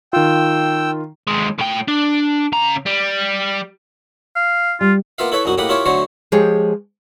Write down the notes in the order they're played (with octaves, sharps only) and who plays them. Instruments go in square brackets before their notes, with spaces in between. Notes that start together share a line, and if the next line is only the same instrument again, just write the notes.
[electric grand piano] D#3 F4 [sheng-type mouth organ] G5 E6
[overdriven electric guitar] D#2 G#3
A2 G5
D4
C#3 A#5
G3
[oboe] F5
[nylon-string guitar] G3 [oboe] F4
[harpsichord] A#3 B3 F4 E5 F5
E4 A4 B4 C#5 E5
C2 F#2 D#4 F#4
A2 A#3 G4 D#5 F#5 B5
E4 F4 G4 A#4 C#5 E5
D3 F#3 A3 C5 C#5
[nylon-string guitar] F3 G#3 G4 G#4 C#5